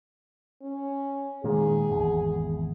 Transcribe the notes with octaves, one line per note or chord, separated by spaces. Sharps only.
C#4
A#2 D#3 G#3 G#4
G#1 E2